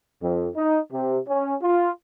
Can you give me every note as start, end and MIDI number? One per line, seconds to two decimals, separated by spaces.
0.22 0.49 41
0.56 0.80 63
0.92 1.18 48
1.28 1.56 61
1.62 1.91 65